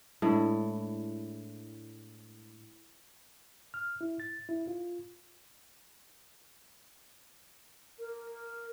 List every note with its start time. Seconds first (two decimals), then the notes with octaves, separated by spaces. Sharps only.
0.22 A2 G#3 D4 E4
3.74 F6
4.01 E4
4.20 A6
4.49 E4
4.67 F4
8.00 A#4